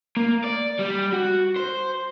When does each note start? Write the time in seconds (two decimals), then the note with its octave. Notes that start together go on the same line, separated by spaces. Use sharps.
0.17 A#3
0.44 D5
0.79 G3
1.12 F#4
1.56 C5